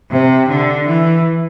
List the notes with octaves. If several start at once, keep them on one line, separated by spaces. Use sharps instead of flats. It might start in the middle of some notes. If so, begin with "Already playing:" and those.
C3
D3
E3